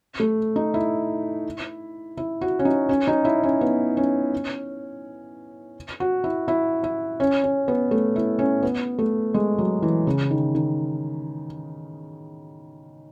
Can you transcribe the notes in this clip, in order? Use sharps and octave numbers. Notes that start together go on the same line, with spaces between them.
A3
D#4
E4
E4
F#4
C#4
D#4
C#4
D#4
E4
C#4
B3
C#4
F#4
E4
E4
E4
C#4
C#4
B3
A3
E4
C#4
B3
A3
G#3
F#3
E3
C#3
D#3
D#3